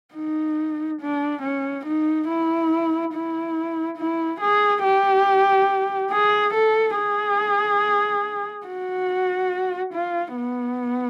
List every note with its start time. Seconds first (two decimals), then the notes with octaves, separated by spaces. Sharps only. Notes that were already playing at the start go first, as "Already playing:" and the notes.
0.15 D#4
1.01 D4
1.42 C#4
1.86 D#4
2.28 E4
3.14 E4
3.98 E4
4.41 G#4
4.84 G4
6.11 G#4
6.54 A4
6.96 G#4
8.67 F#4
9.94 F4
10.36 B3